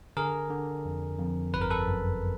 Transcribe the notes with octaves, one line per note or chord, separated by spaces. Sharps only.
D3 G#4 A#4
D3
F2
F2
G1 B4
A#4
A4 B4
F#2